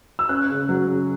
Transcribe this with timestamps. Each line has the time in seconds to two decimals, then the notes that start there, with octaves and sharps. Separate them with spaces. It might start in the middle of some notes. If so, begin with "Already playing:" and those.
0.19 E6
0.29 C#4 F#6
0.49 C#3
0.69 F#3
0.88 C#3